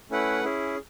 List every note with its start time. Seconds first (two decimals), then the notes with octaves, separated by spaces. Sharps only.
0.10 A3 C#4 E4 B4 F#5
0.44 C#4 E4 G#4